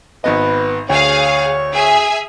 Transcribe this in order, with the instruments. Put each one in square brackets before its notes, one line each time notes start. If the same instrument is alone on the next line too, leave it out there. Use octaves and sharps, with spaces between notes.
[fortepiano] G#1 B3 D#5 [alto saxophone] B4
[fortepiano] D2 [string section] G#4 F5 [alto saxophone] C#5
[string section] G#4 E5 G#5